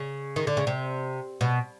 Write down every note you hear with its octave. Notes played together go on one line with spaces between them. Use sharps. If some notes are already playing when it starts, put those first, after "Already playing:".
Already playing: C#3
D#3
D3
C#3
C3
B2